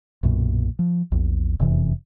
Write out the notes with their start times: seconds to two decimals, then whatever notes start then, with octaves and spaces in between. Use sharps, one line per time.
0.23 B1 F#2 A#2
0.79 F3
1.12 A#1 E2
1.60 E1 F2 C3 E3